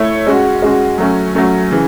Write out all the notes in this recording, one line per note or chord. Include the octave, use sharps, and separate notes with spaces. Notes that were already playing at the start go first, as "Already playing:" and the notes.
Already playing: A3 E4 A4 C#5
G#3 C#4 F#4
G#3 C#4 F#4
F#3 A3 C#4
F#3 A3 C#4
C#3 E3